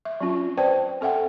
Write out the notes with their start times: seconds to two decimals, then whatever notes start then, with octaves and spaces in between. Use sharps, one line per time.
0.05 E5
0.20 F#3 C4 C#4 F4
0.58 B4 C5 D5 G5 A5
1.01 C4 A4 E5 F#5 G5